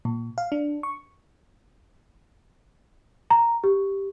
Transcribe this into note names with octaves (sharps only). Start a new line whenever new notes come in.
A#2
F5
D4
C#6
A#5
G4